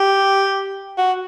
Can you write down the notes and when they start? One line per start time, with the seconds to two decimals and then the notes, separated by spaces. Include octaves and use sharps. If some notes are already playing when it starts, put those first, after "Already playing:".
Already playing: G4
0.98 F#4